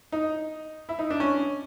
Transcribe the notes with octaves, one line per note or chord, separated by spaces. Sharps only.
D#4
E4
D#4
D4
C#4